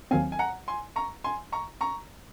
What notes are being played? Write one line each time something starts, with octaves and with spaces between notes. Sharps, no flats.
D#2 D#3 F#3 C4 F5 G#5
G#5
F#5 A#5
G#5 C6
A#5 C#6
G#5 C6
A#5 C#6
A#5 C#6